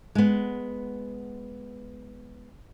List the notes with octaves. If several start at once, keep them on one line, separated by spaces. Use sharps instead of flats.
G#3 B3